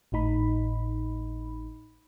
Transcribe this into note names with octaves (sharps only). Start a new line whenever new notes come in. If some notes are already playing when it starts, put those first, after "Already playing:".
G#1 A2 D#4 B5